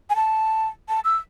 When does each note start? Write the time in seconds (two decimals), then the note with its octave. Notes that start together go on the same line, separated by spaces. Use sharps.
0.10 G#5
0.16 A5
0.89 A5
1.05 E6